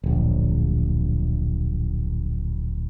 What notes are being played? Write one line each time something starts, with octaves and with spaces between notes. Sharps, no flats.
D1 A#1